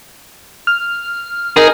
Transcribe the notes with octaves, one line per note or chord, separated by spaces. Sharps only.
F6
D#4 G#4 A#4